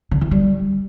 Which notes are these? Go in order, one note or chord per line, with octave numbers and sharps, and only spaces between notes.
D3
E3
G3